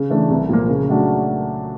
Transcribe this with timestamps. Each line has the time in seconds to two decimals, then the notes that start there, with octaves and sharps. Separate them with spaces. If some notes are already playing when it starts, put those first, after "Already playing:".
Already playing: C#3
0.10 E3 A3 D4
0.30 C2
0.49 A#2 F3 A#3
0.69 C#3
0.88 F#3 A3 D4 F#4